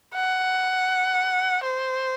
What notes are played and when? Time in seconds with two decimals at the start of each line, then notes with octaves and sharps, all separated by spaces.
0.14 F#5
1.63 C5